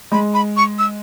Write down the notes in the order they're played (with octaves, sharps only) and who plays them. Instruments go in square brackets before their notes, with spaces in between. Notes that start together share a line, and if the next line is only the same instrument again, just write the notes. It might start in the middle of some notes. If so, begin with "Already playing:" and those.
[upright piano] G#3 [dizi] B5
[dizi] B5
C#6
E6